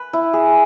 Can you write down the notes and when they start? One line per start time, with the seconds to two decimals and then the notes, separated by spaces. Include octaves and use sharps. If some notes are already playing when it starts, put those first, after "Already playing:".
Already playing: B4
0.13 E4
0.33 G#4